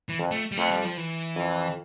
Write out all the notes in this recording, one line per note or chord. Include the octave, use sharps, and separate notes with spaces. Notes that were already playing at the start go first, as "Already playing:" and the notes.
E3
F2
A3
G3
F2 A3
G3
F3
E3
F2